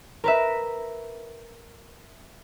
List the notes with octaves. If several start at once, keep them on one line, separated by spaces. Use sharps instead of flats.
A#4 B4 E5